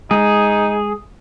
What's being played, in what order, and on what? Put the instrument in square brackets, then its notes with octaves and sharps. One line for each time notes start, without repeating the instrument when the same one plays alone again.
[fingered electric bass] G#3 [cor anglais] D#4 [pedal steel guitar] G#4